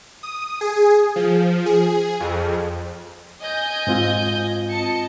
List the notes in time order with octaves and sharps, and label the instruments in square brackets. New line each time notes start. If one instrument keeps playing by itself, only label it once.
[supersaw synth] D#6
G#4
F3
G#4
F2
[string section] D#5 G#5 G6
[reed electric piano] G#2 C4 F4
[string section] D#5 A5 C#7